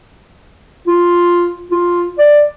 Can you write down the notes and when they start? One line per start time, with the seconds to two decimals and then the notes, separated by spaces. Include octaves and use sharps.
0.88 F4
1.71 F4
2.18 D5